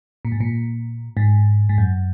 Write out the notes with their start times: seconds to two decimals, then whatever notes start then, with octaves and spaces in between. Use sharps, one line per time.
0.25 A#2
0.32 G#2
0.40 A#2
1.17 G#2
1.69 G#2
1.78 F#2